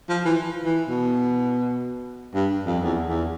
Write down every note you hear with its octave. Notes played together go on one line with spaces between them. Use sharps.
F3
E3
E3
B2
G2
F2
E2
E2